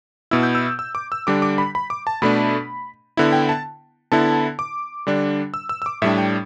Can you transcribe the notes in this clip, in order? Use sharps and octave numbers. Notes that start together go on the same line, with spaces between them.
B2 B3 E4 E6
G6
E6
E6
D6
E6
D3 G3 D4 D6
D6
B5
B5
D6
A5
B2 A3 D4 B5
D3 B3 E4
G5
A5
D3 B3 E4 A5
D6
D3 G3 D4
E6
E6
E6
D6
A2 G3 D4 E5
G5